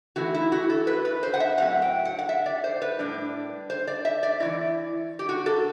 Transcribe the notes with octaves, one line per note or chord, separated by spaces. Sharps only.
E3 A3 C4 E4 F#4
E4
F#4
A4
B4
B4
C5
F#5
E5
A2 F#3 C4 F#5
G5
F#5
F#5
E5
D5
C5
B4
A2 G3 D4
C5
D5
E5
D5
E3 A3 E4
G4
F#4
A4